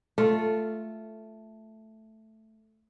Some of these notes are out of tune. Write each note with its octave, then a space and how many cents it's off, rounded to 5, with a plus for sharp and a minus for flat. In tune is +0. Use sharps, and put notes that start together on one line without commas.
A3 +0 F4 -5